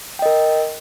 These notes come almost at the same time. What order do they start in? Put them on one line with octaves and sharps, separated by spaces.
G5 D#5 A#4